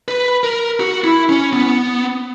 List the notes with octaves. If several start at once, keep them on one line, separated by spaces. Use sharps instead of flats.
B4
A#4
F#4
E4
C#4
B3